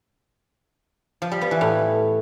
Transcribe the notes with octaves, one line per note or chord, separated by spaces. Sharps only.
F3
G3
B3
E3
A2